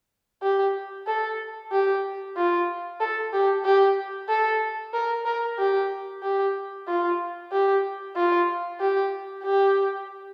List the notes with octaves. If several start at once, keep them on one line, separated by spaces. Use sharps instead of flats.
G4
A4
G4
F4
A4
G4
G4
A4
A#4
A#4
G4
G4
F4
G4
F4
G4
G4